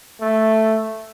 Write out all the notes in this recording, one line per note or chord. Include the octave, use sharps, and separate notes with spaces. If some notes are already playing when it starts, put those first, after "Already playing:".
A3